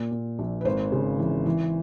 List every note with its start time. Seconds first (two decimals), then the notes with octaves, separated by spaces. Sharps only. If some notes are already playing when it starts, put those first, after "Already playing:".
Already playing: A#2
0.12 A#2
0.39 A#1
0.61 B4
0.65 G#1 C5
0.92 C#3
1.19 E3
1.46 E3